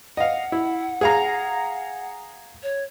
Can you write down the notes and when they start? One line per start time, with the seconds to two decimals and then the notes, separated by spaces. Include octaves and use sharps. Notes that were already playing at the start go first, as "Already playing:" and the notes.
0.17 D#5 F5 F#5
0.52 E4
1.01 G#4 F5 A#5
2.63 C#5